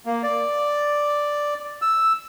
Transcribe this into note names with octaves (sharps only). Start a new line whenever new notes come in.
A#3
D5
E6